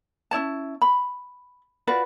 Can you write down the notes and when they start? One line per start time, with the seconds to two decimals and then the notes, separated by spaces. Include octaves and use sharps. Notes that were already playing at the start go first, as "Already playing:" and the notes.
0.31 C#4 E4 C#5 A5
0.82 B5
1.87 F4 F#4 B4 D5